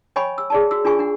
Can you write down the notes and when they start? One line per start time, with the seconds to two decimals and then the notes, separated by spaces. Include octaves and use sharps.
0.16 C#5 D#5 G5 G#5 B5 C#6
0.38 E6
0.50 G#4 D5 A5
0.71 F#4 E6
0.85 D4 F4 G#4 G#5 C#6
0.99 D4 F#5